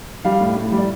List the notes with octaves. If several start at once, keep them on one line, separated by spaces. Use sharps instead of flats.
G3 F5
A2
A2
G3
D5